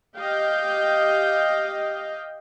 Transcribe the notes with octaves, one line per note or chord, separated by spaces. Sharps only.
G4 D#5 F5 G5